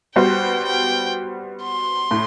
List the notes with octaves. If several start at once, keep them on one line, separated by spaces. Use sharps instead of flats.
G3 B3 F#4 C5 G5
G5
C6
A2